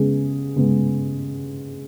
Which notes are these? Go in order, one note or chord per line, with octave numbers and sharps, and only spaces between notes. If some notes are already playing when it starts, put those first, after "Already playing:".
Already playing: C#3 G#3 B3 G#4
C#3 G#3 B3